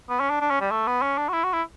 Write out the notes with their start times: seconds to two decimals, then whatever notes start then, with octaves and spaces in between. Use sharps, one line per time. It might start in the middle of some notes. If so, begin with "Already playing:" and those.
0.09 B3
0.20 C#4
0.30 D4
0.40 D4
0.50 C#4
0.61 G3
0.71 A3
0.87 B3
1.02 C#4
1.18 D4
1.29 F#4
1.33 E4
1.44 F#4
1.53 E4